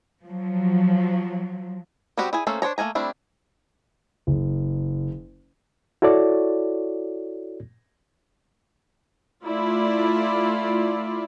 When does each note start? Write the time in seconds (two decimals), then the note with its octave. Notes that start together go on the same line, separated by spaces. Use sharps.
0.24 F3 F#3
2.17 G3 B3 C4 F#4 G4
2.33 E4 G#4 G#5
2.47 A3 A#3 C#4 A4 C5
2.62 D4 C5 C#5 A#5
2.78 A3 A#3 G#5 A#5
2.95 G3 A3 C4 D4 E4
4.27 F#1
6.02 E4 F#4 A4 C#5 D5
9.44 A3 E4 F4 D5